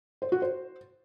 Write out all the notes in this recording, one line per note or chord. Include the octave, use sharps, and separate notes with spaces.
C5
F#4
C5